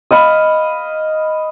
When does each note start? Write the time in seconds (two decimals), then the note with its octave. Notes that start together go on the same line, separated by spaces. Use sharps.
0.11 D#5 F5 B5